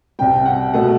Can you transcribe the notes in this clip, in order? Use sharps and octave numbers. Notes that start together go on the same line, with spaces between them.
C2 C3 G3 G5
F#5
B2 A3 F#5